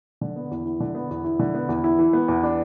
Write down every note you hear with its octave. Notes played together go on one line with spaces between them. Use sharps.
D3
B3
E2
E4
D3
B3
E2
E4
D3
B3
E2
E4
E3
B3
E2
D4